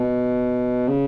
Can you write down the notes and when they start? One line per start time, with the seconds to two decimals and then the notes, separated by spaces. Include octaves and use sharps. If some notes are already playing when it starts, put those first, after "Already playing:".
Already playing: B2
0.88 C#3